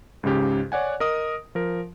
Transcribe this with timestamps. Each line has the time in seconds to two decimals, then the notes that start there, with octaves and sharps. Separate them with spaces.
0.23 C#2 G#2 C#3 G4
0.72 C#5 D5 F#5 G#5
1.00 A#4 D#5 D#6
1.55 F3 A#4